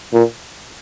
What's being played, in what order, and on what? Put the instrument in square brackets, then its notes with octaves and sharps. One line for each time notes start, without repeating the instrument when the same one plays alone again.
[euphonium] A#2